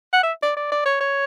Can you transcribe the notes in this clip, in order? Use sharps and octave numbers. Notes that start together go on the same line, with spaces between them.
F#5
E5
D5
D5
D5
C#5
C#5